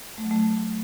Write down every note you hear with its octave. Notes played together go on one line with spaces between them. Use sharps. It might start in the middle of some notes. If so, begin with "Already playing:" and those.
A3
F#3
A3